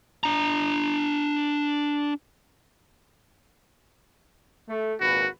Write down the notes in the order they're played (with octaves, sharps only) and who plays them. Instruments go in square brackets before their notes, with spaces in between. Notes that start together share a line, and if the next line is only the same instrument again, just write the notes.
[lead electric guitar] D4 A#5
[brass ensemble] A3
[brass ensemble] G#1 A#2 B4 [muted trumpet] F#4